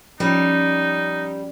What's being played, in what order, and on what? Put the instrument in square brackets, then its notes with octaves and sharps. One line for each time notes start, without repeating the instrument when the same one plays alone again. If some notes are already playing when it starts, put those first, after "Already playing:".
[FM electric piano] F3 C#4 [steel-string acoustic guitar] G3 [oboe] D#4